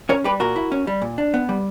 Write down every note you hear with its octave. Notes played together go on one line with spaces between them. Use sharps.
C#4 A#4 C#5
G3 G4 B4
A#2 F#4 A#4
E4
C#4
G3
A#2
D4
B3
G3